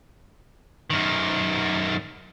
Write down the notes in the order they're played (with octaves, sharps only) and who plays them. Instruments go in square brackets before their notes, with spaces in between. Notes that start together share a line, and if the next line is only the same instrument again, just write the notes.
[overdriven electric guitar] F#2 D#3